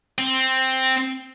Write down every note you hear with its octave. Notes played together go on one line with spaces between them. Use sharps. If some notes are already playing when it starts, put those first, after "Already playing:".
C4